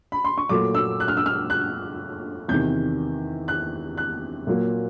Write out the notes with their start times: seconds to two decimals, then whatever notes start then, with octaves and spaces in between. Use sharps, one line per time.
0.12 B5
0.25 C6
0.38 C#6
0.49 A#2 F#3 A3 D6
0.75 E6
1.00 F#6
1.08 F6
1.17 E6
1.26 F6
1.50 F#6
2.48 E2 C3 D#3 G6
3.48 F#6
3.97 F#6
4.47 A#2 F#3 A#3